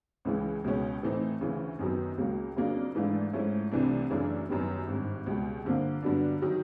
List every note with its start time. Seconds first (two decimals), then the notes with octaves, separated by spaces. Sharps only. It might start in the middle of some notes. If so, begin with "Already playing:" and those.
0.25 C#2 C#3 E3 G#3
0.64 C#2 B2 G#3 C#4
1.03 A2 E3 A3 C4 D#4
1.41 D2 C#3 E3
1.79 F#2 D#3 F#3 B3
2.18 C#2 C#3 F#3 A#3
2.57 F2 C#3 F#3 A#3 D4
2.95 G#2 E3 A3 D4 F4
3.33 G#2 F3 A3 C#4 E4
3.72 C2 C3 E3 A3 D4
4.10 F#2 C#3 E3 A3 D4
4.49 F#2 D#3 G3 B3
4.87 G#1 G2 D#3
5.26 C#2 B2 G3
5.64 G2 D3 F3 A#3
6.03 G2 D3 F#3 B3 D4
6.42 D#3 F#3